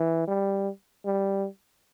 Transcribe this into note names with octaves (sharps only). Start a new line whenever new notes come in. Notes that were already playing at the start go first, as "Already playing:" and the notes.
Already playing: E3
G3
G3